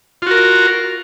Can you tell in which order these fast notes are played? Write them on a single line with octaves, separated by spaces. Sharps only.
F4 F#4 A#4